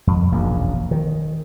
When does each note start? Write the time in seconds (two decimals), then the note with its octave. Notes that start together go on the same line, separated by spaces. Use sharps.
0.07 F2
0.32 E1 A#1 F#2 A#3
0.91 D#3